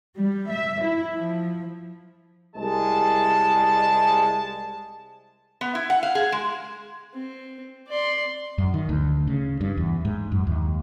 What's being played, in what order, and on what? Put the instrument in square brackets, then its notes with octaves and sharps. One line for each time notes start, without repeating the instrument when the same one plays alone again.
[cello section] G3
E5
E4
F3
[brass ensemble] C2 G#3 A5
[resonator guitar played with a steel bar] B3
E4
F#5
F5
G#4
G#3
[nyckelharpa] C4
D5 C6
[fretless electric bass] F#2
D#3
D2
C#3
G2
E2
G#2
F#2
D#2